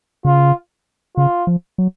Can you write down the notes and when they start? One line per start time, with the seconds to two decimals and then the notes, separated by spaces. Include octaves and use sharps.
0.25 C#3 F4
1.16 C#3 F4
1.47 F3
1.78 F#3